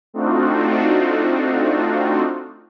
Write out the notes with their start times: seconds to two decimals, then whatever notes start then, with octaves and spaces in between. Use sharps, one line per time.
0.14 A3 C4 D4 D#4 F4 F#4